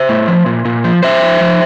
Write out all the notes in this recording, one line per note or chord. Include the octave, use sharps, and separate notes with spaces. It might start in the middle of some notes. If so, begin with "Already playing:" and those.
Already playing: C5 E5
A2
F3
A#2
A#2
F3
F3 C5 E5
F3
F3